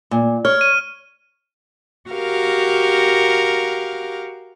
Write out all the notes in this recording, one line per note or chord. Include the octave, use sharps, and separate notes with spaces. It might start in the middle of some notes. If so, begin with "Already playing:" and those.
A#2
C#5 F6
D#7
F#4 G4 A#4 F5